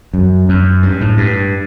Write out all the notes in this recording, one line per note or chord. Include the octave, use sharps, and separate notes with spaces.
F#2
F#2
G2
A2
G2